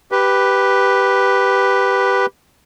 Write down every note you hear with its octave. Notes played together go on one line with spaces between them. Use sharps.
G4 B4